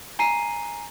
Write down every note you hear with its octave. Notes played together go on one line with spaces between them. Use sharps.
G#5 A#5 C7 D#7